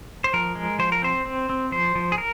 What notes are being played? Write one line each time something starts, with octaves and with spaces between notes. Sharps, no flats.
C5
F3 A#4
G#3
F3 C5
A#4
C4 C5
C4
C4
F3 C5
F3
G#4
A#4